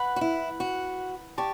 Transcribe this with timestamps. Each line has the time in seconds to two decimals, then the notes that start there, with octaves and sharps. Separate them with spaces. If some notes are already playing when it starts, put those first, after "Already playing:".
Already playing: B4 F#5 B5
0.16 F#4
0.21 E4
0.60 F#4
1.38 G4 D5 A5 C#6